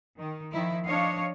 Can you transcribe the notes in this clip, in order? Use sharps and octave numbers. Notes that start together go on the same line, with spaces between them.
D#3
D#3 F3 E4
F3 D4 C#5 D#5 F5